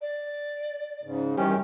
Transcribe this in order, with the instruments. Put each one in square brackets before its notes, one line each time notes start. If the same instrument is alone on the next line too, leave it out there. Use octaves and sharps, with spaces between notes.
[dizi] D5
[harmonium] G#2 C#3
[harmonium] F#2 [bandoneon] D#3 E3 C#4 [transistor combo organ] G3 G4